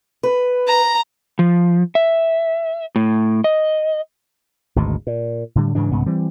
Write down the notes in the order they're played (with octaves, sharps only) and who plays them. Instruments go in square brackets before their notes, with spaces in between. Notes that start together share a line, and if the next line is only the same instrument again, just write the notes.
[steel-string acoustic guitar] B4
[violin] A#5
[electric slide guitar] F3
E5
A2
D#5
[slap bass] G#1 D2 G#2 B2
A#2
A2 D3 G3
G#2 C#3 E3 D4
C2 G#2 C#3 B3
E3 G3 C4